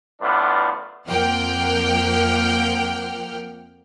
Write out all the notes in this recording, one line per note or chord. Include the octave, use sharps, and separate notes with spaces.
F#2 A2 E3 B3 D4 F4
F2 F3 A#3 F#5 G5 F6